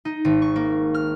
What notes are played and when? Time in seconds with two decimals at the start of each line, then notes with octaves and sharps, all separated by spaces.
0.05 D#4
0.25 G#1
0.42 C#6
0.56 A#3
0.94 F6